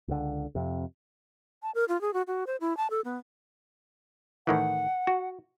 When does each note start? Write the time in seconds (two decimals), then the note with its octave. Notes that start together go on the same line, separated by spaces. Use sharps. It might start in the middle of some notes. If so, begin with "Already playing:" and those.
0.08 C#2 D3
0.55 F2 C3
1.63 A5
1.75 A#4
1.88 F4
2.01 G#4
2.14 F#4
2.27 F#4
2.47 C5
2.61 E4
2.77 A5
2.90 A4
3.05 B3
4.47 A2 D#3 E3 F#5
5.07 F#4